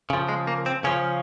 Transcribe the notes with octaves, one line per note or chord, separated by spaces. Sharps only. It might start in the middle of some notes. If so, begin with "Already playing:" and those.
C#3 F3
G#3
A#3
C4
C#3 F3 C#4